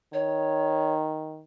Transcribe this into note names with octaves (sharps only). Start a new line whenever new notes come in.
D#3 C#5